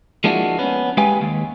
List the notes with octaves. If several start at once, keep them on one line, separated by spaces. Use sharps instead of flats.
F3 G#3 A#3 D4 E4 F#4
B3 C#4
G#3 G4 B4 F5 G5 G#5
D#2